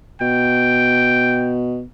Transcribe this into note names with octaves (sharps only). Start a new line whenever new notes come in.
B2 G5